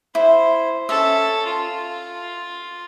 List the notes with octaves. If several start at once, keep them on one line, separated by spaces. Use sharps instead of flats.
E4 C5
C#4 A4 E5
F4